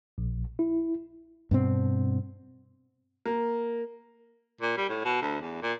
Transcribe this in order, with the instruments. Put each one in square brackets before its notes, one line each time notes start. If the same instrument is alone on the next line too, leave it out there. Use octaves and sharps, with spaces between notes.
[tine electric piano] A#1
E4
[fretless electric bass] G2 B2 C4
[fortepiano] A#3
[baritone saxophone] A#2
G3
A2
B2
D2
E2
A#2